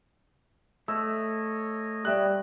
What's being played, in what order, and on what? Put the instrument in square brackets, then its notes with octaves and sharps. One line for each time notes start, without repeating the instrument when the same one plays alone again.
[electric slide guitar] A3 [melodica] C#5 D#5 [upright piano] E6
[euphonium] G3 [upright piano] D5 E5 F#6